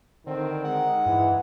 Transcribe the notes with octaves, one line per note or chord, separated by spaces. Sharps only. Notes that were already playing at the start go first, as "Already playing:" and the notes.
D3 D#3 C4
G#3 F#5
G2 E3